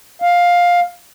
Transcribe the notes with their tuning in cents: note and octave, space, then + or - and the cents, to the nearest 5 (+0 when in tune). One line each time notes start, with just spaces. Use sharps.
F5 +10